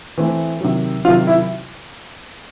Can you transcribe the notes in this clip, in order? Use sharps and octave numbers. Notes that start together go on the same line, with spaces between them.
E3 A3 C4
C3 D#3 F#3
C3 D#3 F#3 F4
E4